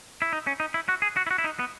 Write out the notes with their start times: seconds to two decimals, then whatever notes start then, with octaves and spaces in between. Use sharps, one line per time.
0.22 E4
0.33 D#4
0.47 C#4
0.60 D#4
0.74 E4
0.89 F#4
1.02 G#4
1.17 F#4
1.27 E4
1.31 F#4
1.38 E4
1.44 D#4
1.59 B3